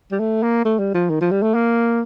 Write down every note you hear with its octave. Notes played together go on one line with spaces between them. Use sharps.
G3
A3
A#3
A3
G3
F3
D#3
F3
G3
A3
A#3